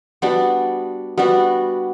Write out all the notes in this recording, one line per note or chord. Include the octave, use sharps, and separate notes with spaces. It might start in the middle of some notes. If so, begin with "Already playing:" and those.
G3 B3 D4 F#4
G3 B3 D4 F#4